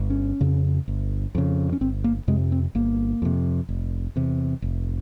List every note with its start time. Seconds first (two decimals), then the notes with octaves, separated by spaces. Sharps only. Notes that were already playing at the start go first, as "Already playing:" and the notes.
Already playing: G1
0.10 C#4
0.41 F2 C#3
0.88 G1
1.35 F2 C#3
1.72 C#4
1.81 G1 C4
2.04 A#3
2.28 F2 C3 G#3
2.52 C4
2.75 G1 A#3
3.22 F2 C3
3.69 F1
4.16 E2 C3
4.62 F1